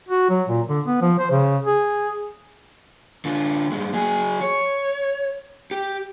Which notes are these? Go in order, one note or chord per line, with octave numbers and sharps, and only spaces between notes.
F#4
F#3
A#2
D3
B3
F3
C5
C#3
G#4
D3 F4
G2 G#3
F#3 G#4
C#5
G4